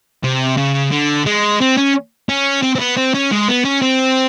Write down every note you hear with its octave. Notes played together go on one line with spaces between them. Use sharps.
C3
C#3
D3
G#3
C4
C#4
C#4
C4
C4
B3
C4
C#4
G#3
B3
C#4
C4